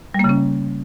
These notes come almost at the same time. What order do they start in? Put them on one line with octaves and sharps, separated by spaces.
G3 A#3 C#3 C#4